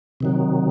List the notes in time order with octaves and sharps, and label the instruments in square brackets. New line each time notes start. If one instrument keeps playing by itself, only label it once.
[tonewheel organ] C3 D#3 F#3